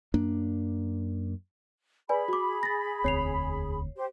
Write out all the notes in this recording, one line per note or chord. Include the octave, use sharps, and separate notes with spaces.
F#2 A#3 D4
G#4 B4 D5 G#5 B5
F#4 D6
A6 A#6
E1 D2 C4 C#5 C7 F7
G4 C5